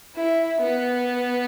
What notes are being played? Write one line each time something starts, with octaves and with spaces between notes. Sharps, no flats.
E4
B3